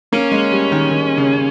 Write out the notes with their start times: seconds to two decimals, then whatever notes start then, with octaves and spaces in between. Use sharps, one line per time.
0.12 A#3 C#4
0.32 G#3
0.52 G3
0.72 D#3
0.91 D#3
1.17 C#3